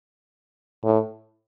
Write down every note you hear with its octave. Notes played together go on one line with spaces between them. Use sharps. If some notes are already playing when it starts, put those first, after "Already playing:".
A2